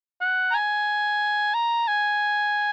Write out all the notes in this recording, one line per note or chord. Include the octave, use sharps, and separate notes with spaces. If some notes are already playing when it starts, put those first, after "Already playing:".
F#5
A#5
G#5
A#5
G#5